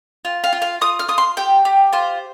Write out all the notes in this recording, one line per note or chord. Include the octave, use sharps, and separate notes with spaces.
F4
F5
F4
F5
F4 D#6
F6
F4 D#6
C6
G4 G5
G4
F4 C5